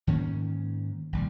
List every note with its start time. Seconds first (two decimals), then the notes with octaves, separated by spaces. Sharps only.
0.07 G#2 D#3 A#3 C#4
1.13 A#1 D#2 G3